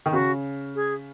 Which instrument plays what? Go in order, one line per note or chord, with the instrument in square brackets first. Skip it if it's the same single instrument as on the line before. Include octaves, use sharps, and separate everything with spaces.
[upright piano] D#3
[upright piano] C#3 [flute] F#4
[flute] G#4